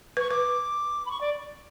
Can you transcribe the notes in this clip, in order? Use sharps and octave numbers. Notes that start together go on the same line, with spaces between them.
B4 C#6
B4 D6
B5
C#6
D5